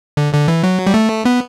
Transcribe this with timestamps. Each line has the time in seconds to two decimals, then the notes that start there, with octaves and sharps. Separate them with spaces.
0.17 D3
0.33 D3
0.48 E3
0.64 F#3
0.87 G3
0.94 A3
1.25 B3